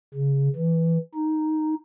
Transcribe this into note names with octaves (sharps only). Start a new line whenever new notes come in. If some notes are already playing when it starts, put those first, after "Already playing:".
C#3
E3
D#4